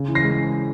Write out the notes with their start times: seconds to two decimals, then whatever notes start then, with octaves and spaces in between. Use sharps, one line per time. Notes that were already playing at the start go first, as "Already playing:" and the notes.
Already playing: C#3
0.08 E3
0.15 A#6 C7
0.23 G#3